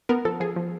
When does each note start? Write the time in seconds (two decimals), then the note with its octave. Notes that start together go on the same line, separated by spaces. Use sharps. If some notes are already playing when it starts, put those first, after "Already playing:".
0.09 B3 A#4
0.25 F3 A4
0.40 F3 G#4
0.56 F3